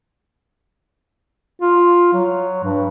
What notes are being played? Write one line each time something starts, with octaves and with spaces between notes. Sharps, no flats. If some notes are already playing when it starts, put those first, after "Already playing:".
F4
F#3
G2